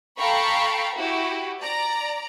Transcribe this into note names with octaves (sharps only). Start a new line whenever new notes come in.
A4 F5 G5 A#5 B5 C#6
E4 F#4 G4
D5 A#5